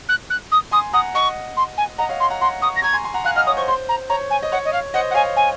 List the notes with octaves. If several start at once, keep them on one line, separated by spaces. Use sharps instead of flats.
F#6
F#6
D#6
G#5 C6 D#6
F#5 A#5 D#6
D#5 F#5 C#6
C6
G#5
D#5 F#5 A#5
C#5 F5
C6
F#5 A#5
F#5 A#5 C6
A#5 C#6 D#6
A#6
A#5 C#6 G#6
G#5 C6
G#5 C6
F#5 A#5
F5 G#5 F#6
D#5 F#5 F6
C#5 D#6
C5 C#6
C5 C6
A#5
C#5 A#5
G#5
D#5
C#5 F#5
D#5
F5
C5 D#5 F#5
F#5
C#5 F5 G#5
G#5